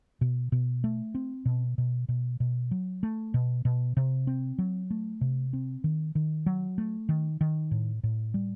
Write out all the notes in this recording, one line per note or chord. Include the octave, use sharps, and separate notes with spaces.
B2
B2
A3
C4
B2
B2
B2
B2
F#3
A3
B2
B2
C3
C4
F#3
A3
C3
C4
D#3
D#3
F#3
A3
D#3
D#3
A2
A2
G3